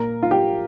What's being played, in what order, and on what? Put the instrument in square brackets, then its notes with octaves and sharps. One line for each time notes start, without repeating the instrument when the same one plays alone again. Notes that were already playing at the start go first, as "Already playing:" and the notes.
Already playing: [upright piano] A#2 A#3 A#4
F4
G4